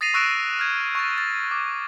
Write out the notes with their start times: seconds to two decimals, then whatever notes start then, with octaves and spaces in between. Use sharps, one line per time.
0.01 D#6 A6 A#6 C7 D#7 F7
0.14 C#6 E6 F#6 A#6 D7 E7
0.59 F6 G#6
0.95 C#6 A6
1.18 A6
1.51 D6